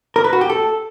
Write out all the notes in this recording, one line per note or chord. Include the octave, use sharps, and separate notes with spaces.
A#4
B4
F#4
G4
A4